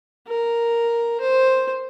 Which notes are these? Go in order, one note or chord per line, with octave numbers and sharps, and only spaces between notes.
A#4
C5